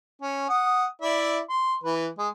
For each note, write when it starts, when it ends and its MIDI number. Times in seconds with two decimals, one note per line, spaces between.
0.22 0.44 61
0.49 0.86 78
0.49 0.86 87
1.02 1.39 64
1.02 1.39 74
1.02 1.39 76
1.49 1.75 84
1.83 2.07 52
1.83 2.07 71
2.19 2.28 56